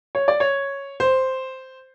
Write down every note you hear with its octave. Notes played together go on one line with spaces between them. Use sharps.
C#5
D5
C#5
C5